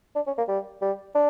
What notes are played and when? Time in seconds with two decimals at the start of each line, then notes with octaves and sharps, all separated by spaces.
0.15 D4
0.27 C#4
0.38 A#3
0.48 G3
0.82 G3
1.15 D4